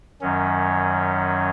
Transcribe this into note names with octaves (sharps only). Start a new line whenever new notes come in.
F#2 D#3 F#3 C#4